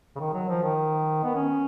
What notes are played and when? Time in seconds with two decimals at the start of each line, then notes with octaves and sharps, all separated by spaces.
0.16 C#3
0.19 D#3
0.34 F#3
0.48 F3
0.63 D#3
1.24 B3
1.35 C#4